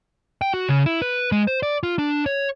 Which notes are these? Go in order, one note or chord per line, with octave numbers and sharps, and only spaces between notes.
G5
F#4
C#3
E4
B4
G#3
C5
D5
F4
D4
C#5